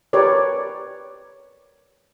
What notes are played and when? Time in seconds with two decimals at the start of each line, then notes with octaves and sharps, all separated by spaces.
0.13 G4 A#4 B4 C#5 D5